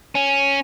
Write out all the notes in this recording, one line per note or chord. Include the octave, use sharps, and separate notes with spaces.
C#4